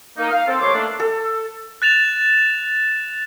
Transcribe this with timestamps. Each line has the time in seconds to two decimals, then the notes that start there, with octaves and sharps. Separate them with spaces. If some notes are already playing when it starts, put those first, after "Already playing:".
0.18 A#3 D#4
0.30 F5
0.47 C4 A4
0.61 D#2 F3 A3 C#5 C6 D6
0.74 A3 A#3 D4
1.00 A4
1.82 F#6 A6 E7 F7